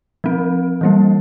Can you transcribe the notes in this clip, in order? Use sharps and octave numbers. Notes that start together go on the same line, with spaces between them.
F3 C4
E3 G3 A#3